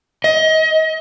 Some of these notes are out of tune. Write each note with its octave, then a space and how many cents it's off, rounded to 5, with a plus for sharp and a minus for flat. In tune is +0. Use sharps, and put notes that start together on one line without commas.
D#5 +30